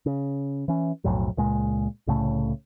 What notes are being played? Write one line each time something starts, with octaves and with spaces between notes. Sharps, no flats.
C#3
E3 C#4
B1 F2 A2 F#3
C#2 A#2 G#3
C2 A2 C#3 A3